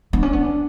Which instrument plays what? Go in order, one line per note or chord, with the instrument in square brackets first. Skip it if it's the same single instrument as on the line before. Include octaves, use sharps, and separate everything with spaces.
[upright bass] B3 [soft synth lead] D4
[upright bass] C#4
B3